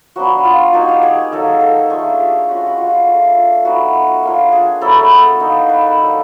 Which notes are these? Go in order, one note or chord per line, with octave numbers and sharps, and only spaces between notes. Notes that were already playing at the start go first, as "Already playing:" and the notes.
F#3 B3 D4 F#4
F4
A#3 D#4 F#4
G4
G#4
F#3 A#3 D#4 A4
A4
A3 D4 F4 G#4
G4
G#3 C#4 F4 F#4
F#4
F4
A3 D4 F4
F#3 B3 D#4 F#4
A#3 D4 F4
G#4
F#3 B3 E4 A4
A4
A#3 D#4
B4
F#3 A#3 D4 A4